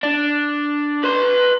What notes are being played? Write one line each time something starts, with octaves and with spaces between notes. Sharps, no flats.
D4
B4 C6